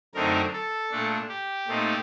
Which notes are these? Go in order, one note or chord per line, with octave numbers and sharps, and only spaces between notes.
F#2 D3 A3 C4 D#4 A#4
A4
A#2 A3 D4
G4
A#2 A3 C4 D#4